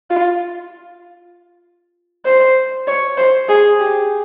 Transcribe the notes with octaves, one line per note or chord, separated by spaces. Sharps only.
F4
C5
C#5
C5
G#4
G4